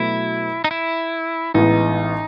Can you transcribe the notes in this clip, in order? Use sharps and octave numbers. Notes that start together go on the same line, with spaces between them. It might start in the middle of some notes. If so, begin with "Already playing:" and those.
Already playing: B2 F#3 A3 E4
D#4
E4
A1 A2 E3 G#3 B3 D#4